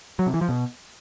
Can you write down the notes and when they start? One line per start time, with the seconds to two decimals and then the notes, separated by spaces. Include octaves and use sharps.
0.19 F#3
0.26 C3
0.34 E3
0.41 F3
0.49 B2